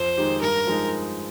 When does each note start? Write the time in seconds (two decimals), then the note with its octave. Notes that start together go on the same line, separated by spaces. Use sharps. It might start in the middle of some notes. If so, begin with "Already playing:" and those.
Already playing: F2 C5
0.17 D#3 G#3 D#4 G4
0.42 G2 A#4
0.67 F3 G#3 D#4